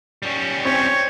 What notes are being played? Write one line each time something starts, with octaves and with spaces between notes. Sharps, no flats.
G3 C#4
C4 C#5